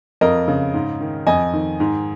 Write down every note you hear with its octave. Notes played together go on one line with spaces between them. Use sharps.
F2 A#4 D#5
C#3
G#2
D#3
F2 D#5 G#5
D#3
G#2